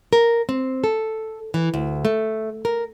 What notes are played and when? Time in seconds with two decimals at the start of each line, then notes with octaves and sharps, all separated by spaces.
0.13 A#4
0.49 C4
0.84 A4
1.54 E3
1.74 D2
2.05 A3
2.65 A#4